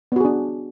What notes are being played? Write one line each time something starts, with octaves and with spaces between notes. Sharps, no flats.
B3 D4 F#4 G#4